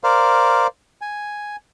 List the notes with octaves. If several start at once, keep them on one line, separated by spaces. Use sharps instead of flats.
A#4 C5 D5 F5
G#5